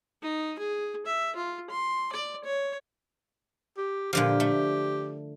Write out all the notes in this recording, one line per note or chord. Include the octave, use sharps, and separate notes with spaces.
D#4
G#4
E5
F4
C6
D5
C#5
G4
A#2 D3 F3 G4
A3